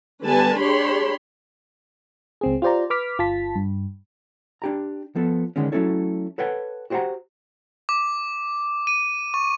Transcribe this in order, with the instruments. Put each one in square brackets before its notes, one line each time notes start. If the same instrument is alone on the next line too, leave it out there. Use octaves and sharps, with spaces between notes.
[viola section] D3 G3 B3 B4 G#5 A5
D4 G4 G#4 C#5 B5 C6
[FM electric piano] C#2 C4 G#4
F4 G4 C5 D5 A#5
B4 D6 F6 B6
G1 F4 A5 B6
G2
[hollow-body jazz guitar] D4 G4 A#5
F3 B3 A4
D3 D#3 G#3 C#4
F#3 A3 C#4 E4 A4 C#5
A4 B4 C#5 F#5 G5
F#4 G4 C5 D#5 F#5 A#5
[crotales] D6
D#7
C#6